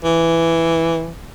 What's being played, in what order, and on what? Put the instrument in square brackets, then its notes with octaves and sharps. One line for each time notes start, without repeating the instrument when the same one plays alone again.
[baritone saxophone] E3